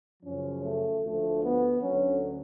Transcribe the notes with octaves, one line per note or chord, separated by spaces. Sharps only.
F#2 C#3 F3 C#4
A3
D2 D3 F3 A3
B3
D2 D3 F#3 C#4